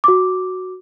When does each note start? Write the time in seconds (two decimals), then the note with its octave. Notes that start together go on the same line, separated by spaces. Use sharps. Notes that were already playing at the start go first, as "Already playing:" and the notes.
0.04 F#4 D6